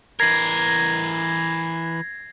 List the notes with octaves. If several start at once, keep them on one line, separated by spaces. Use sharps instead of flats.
E3 A#4 G#6 A#6 C7